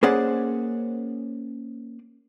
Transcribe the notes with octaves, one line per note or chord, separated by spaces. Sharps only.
A#3 C#4 G#4 C5 D5 F#5